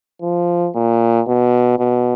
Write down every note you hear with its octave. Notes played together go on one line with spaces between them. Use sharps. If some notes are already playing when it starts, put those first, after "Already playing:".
F3
A#2
B2
B2